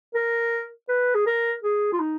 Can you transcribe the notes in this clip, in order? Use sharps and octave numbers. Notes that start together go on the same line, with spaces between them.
A#4
B4
G#4
A#4
G#4
F4
D#4